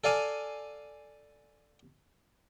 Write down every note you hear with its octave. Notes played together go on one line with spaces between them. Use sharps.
A4 D5 F5 G#5